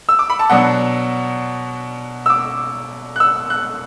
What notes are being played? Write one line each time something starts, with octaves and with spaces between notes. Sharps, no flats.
E6
D6
B5
A5
B2 F#3 D4 F#5
E6
D6
F#6
E6
F#6